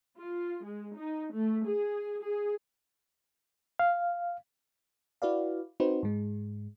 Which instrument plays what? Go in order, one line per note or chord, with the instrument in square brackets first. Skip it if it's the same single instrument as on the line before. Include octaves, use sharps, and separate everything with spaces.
[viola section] F4
G#3
D#4
A3
G#4
G#4
[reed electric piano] F5
[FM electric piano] E4 F#4 B4 D5 F5
C4 D#4 F#4 B4 C5
G#2 G#3